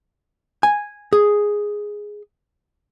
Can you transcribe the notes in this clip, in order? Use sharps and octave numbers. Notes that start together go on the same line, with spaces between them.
G#5
G#4